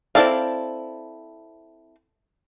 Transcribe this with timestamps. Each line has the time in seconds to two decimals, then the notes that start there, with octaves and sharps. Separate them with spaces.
0.15 C4 E4 A4 D5 F5